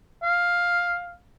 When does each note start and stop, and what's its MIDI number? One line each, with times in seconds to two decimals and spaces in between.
0.23 1.15 77